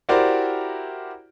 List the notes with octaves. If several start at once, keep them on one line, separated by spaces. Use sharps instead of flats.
E4 F#4 G4 A#4 C5 D5